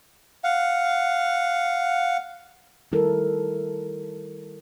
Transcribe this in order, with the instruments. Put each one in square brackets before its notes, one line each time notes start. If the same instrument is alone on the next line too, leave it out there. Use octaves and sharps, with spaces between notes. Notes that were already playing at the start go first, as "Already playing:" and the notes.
[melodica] F5 F#5
[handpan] D#3 G3 E4 A4 A#4